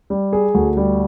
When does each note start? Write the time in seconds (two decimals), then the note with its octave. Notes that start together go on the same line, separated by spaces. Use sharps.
0.10 G3
0.33 G#4
0.54 D2
0.77 G3